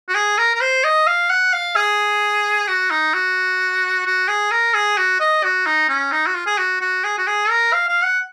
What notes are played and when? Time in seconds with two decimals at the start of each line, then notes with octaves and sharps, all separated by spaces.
0.08 F#4
0.15 G#4
0.38 A#4
0.55 A#4
0.61 C5
0.84 D#5
1.07 F5
1.30 F#5
1.53 F5
1.76 G#4
2.68 F#4
2.90 D#4
3.14 F#4
4.06 F#4
4.28 G#4
4.51 A#4
4.74 G#4
4.98 F#4
5.20 D#5
5.44 F#4
5.66 D#4
5.89 C#4
6.12 D#4
6.27 F#4
6.35 F4
6.46 G#4
6.58 F#4
6.81 F#4
7.04 G#4
7.18 F#4
7.27 G#4
7.50 A#4
7.73 F5
7.88 F5
8.04 F#5